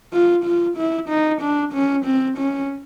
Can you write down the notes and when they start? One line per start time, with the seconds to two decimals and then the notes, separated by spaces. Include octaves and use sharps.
0.13 F4
0.45 F4
0.77 E4
1.09 D#4
1.41 D4
1.73 C#4
2.05 C4
2.38 C#4